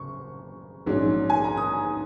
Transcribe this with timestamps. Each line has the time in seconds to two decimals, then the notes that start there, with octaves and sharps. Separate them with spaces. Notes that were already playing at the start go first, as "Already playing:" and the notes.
Already playing: F#1 C#6
0.86 A#1 G#2 F#3 C#4
1.30 G#5
1.44 A#5
1.57 D#6